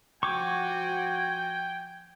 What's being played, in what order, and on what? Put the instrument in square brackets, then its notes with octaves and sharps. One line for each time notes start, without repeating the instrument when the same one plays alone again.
[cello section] F3 F#4 [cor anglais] G5 [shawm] G#5 [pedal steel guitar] C#6 D6